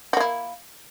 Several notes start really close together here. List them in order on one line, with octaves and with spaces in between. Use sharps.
F#4 A#3 E4